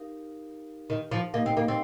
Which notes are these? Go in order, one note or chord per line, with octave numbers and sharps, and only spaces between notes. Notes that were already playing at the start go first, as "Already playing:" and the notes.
Already playing: D#4 G4 A#4 F5
D#3
F3
A#3 D#4 G4 A#4 D#5
C4
A#3
C4